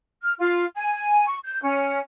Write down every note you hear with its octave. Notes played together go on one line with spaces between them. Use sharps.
F6
F4
G#5
C#6
G6
C#4